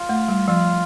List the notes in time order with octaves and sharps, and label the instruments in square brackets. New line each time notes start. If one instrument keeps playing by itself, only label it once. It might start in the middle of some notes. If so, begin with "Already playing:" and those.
Already playing: [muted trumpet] F4
[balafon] A3
G3
[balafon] F3 [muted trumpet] F4